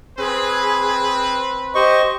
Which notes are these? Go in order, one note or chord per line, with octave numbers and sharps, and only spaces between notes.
C4 G#4 B4
G4 C5 D#5 C#6